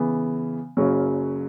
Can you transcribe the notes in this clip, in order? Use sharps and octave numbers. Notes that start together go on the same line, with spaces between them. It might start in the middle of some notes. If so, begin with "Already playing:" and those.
Already playing: C#3 E3 B3
F#1 F#2 C#3 F#3 C#4